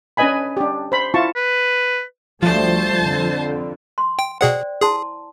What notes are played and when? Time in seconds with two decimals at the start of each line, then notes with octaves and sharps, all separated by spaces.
0.17 C#4 D4 B4 D#5 G#5 B5
0.57 D4 G4
0.92 C5 B5
1.14 E4 F4 A5 C#6
1.36 B4
2.43 D2 F3 G3 A3 C5 A5
3.01 F2 D3
3.98 C6
4.19 G5
4.41 B2 G#4 C5 D5 F#5 G5
4.82 E4 G#4 A5 C6